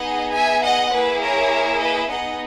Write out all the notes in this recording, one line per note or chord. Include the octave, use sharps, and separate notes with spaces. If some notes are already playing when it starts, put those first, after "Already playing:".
Already playing: B3 D#4 G#4 D#5 F#5
E5 G#5
D#5 F#5
A#3 E4 G#4 B4
A#4 C#5
B4 D#5
B3 D#4 G#4 D#5 F#5